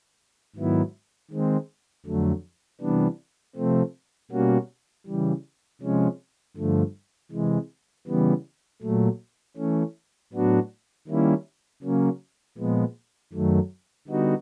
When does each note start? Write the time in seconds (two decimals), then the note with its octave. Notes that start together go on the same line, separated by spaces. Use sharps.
0.56 G#2 D#3 F#3 B3 E4
1.31 D#3 G#3 C4
2.06 F2 D3 F#3 A3
2.81 C3 E3 G3 B3 D4
3.56 C3 F3 A3 C4
4.31 B2 G3 A#3 C#4 F#4
5.06 C#3 E3 G3
5.82 C3 F3 G#3 C#4
6.57 G2 D3 F3 A3
7.32 C3 E3 G#3
8.07 C#3 E3 G3 B3
8.82 A#2 F#3 A3
9.57 E3 A3 C#4
10.33 A2 F#3 B3 D4 F#4
11.08 D#3 G3 A#3 C#4 E4
11.82 C#3 F#3 A#3 C#4
12.58 A#2 F3 G#3 B3
13.33 F#2 D#3 F#3 A3
14.08 D3 G3 B3 D#4 F#4